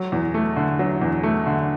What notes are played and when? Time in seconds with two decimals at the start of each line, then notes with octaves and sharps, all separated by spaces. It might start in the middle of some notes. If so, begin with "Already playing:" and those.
Already playing: F#3
0.12 E2
0.34 A3
0.56 D3
0.79 F#3
1.02 E2
1.23 A3
1.46 D3